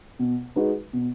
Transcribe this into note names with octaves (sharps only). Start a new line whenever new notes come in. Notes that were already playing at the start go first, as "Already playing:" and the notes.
B2
G#3 D#4 F#4 B4
B2